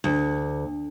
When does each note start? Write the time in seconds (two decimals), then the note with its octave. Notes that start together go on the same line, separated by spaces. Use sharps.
0.04 D2